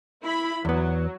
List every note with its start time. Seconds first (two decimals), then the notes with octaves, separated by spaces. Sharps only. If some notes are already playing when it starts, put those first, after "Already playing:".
0.23 E4 B5
0.65 E2 F#3 B3